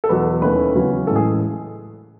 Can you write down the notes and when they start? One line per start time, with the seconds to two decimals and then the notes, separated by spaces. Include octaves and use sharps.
0.04 A4
0.09 E2 B2 F#3 B3 B4
0.42 D#2 D#3 A3 C#4 E4 B4
0.75 E2 C#3 F#3 C#4 E4
1.07 A2 E3 G#3 C#4 A4
1.16 G#4